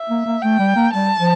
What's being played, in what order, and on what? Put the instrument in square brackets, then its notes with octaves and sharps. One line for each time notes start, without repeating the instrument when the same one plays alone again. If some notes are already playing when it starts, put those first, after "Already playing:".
Already playing: [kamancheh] E5
[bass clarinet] A#3
A#3
[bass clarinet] A3 [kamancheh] G5
[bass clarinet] G3
A#3
[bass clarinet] G3 [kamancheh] A5
[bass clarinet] F3